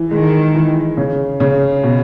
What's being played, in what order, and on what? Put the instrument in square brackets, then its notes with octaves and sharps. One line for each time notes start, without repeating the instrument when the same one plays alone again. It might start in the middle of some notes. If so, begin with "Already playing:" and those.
Already playing: [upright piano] E3
[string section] D#3 [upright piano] G#3
[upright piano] E3
C#3
C#3
B2